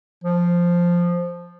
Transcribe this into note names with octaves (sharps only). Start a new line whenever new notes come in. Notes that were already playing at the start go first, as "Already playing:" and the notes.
F3